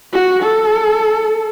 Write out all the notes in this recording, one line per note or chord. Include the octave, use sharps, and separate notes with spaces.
F#4
A4